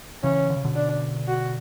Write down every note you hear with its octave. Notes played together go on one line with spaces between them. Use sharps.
C#3 E3 C#4
D3
C#3
B2 D3
D4
F#4